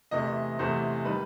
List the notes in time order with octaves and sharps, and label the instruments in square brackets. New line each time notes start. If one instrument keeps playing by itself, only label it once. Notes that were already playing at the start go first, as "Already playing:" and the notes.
[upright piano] E2 C3 E3 A3 D#5
E2 C3 E3 A3 C5
D#3 G3 B4